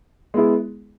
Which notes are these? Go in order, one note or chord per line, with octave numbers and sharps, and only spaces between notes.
G#3 B3 E4 G#4